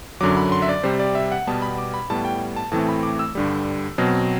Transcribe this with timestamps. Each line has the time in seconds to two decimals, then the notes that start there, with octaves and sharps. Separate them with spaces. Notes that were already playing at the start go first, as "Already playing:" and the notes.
0.21 F#2 D3 F#3 D6
0.37 B5
0.52 C6
0.62 E5
0.69 D5
0.83 C3 G3 C4 C5
0.99 D5
1.15 E5
1.32 F#5
1.47 B2 G3 B3 A5
1.62 B5
1.78 D6
1.94 B5
2.10 A2 G3 B3 A5
2.25 G5
2.56 A5
2.72 A2 E3 A3 C4 A5
2.89 B5
3.03 D6
3.19 E6
3.35 G2 D3 G3
3.98 B2 F#3 C4